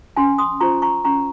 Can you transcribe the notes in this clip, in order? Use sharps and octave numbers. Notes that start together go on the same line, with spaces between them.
C#4 G#5 C6
C6 D#6
F4 C5 A#5 C#6
A#5 C#6
C#4 A#5 C#6